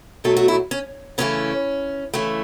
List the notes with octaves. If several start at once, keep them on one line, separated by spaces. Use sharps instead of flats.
B2 F#3 A3 A4
F#4
E4
C#4
C#3 E3 A3 C#4
C#3 E3 A3